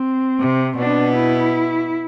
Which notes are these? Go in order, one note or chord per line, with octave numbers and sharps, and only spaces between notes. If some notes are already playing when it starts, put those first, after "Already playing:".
Already playing: C4
C3
B2 B3 D4
E4